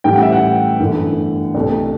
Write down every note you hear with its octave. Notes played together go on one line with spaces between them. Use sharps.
A1 A2 E3 G3 G5
F#5
E5
F#5
G1 F#2 E3 A3
C2 B2 A3